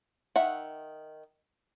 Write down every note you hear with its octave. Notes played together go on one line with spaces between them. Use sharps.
D#3 E5 F#5